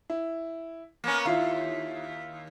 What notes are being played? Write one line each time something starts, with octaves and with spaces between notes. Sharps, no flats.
E4
A#3 B3 C#4
D#2 E4 F4 F5